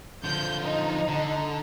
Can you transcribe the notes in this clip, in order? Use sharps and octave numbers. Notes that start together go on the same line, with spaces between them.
D3 F3 G6
D#4
D3